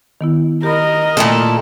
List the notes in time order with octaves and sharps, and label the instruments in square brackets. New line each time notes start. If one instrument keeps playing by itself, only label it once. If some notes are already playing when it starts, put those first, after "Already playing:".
[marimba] D#3 B3 E4
[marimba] G4 B5 [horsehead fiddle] A#4 D#5
[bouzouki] A#2 E4 A4 [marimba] A3 A#3